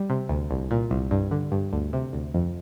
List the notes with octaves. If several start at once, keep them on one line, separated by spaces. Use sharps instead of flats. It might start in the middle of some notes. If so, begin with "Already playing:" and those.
Already playing: G3
C3
D2
C2
A#2
C2
G2
D3
G2
D2
C3
D2
F2